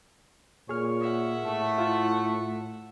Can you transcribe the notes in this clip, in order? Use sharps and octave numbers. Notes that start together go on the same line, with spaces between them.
A#2 G#4 C#5 F6
E5 F#5
A2 A3
E4 F4